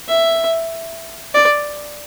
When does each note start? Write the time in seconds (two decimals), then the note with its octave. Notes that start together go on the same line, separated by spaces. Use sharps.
0.09 E5
1.34 D5